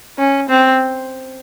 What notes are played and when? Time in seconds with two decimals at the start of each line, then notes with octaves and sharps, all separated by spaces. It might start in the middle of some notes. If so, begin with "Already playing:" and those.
0.18 C#4
0.49 C4